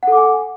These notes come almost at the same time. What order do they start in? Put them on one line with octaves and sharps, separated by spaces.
F#5 A4 D6 G#5